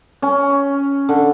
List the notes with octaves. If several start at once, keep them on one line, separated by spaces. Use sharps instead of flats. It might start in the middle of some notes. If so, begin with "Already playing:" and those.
C#4
D3